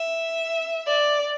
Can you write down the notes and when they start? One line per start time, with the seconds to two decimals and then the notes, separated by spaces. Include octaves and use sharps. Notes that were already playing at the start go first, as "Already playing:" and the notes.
Already playing: E5
0.87 D5